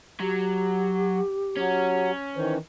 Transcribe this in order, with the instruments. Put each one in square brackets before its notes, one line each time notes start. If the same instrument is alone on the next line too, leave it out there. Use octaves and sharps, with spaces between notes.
[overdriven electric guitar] F#3 [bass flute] G4
[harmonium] F#3 [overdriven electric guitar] C#4
[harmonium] D#3 E3 [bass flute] C5